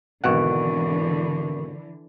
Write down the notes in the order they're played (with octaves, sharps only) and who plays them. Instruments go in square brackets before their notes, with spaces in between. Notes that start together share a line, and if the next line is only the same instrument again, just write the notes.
[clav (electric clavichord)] G#1 B2 F#5 [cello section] D3 E3 [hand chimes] A#4 C#6 D7